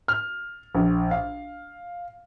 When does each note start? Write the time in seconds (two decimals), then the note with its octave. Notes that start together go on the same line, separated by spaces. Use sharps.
0.08 F6
0.75 A#1
1.11 F5